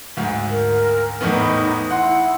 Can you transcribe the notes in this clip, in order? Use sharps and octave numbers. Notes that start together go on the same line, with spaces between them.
D2 G#2
A#4
E2 A2 B3 D#4
E4 F#5 C6